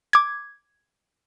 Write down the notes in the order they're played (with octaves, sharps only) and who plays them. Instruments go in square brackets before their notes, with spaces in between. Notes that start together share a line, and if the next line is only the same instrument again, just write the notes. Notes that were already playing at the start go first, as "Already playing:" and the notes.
[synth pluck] D6 G#6